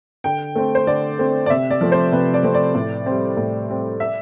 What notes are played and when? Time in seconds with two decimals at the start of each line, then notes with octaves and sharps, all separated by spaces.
0.24 D3 G5
0.55 A3 C4
0.75 C5
0.87 D3 D5
1.19 A3 C4
1.46 D5
1.50 C3 E5
1.70 D5
1.81 F3 A3 C4
1.92 C5
2.12 C3 B4
2.34 D5
2.43 F3 A3 C4
2.54 D5
2.75 A2
3.06 G3 C4
3.37 A2
3.69 G3 C4
4.00 E5